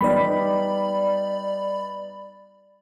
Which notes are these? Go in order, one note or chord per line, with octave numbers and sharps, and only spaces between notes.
G3 B3 D#4 D5 B5